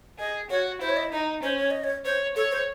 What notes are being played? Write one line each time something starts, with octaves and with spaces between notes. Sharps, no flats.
G#4 D#5
F#4 C#5
E4 C5
C#5
D#5
D#4 D#5
C#4 C5
C#5
D#5
C#5
C5 C#5
A4 C#5
C5